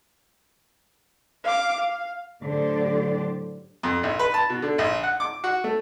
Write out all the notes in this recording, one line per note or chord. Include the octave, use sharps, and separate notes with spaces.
F5 D6
F5
A2 D3 F#3 G4 C5 D5
F2
A#1
B4
A5
B2
D3
A#1
F#5
D6
F#4
A3